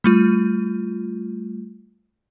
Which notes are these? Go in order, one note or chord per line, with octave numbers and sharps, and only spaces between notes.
G3 A3 F4